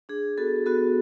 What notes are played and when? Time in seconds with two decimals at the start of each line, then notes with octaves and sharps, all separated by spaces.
0.09 D4 G#4
0.38 B3 F#4 A4
0.66 B3 F#4 A4